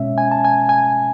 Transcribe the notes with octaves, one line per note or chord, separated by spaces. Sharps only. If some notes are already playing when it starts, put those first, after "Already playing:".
Already playing: B2 G#3 C#4 E5
G#5
A5
G#5
G#5